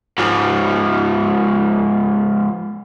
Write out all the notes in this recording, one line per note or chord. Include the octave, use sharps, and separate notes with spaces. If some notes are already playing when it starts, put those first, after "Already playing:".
G#2 F3